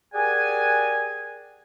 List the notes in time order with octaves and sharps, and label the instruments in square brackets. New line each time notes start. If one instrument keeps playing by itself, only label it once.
[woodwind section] G4 G#4 A#4 D5 F#5 G#5